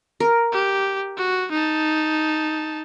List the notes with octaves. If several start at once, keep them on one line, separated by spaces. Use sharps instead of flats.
A#4
G4
F#4
D#4 A5